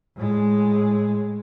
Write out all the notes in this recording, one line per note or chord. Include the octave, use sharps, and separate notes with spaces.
A2 G#3